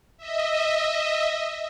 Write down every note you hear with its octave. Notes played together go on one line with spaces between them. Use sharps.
D#5 E5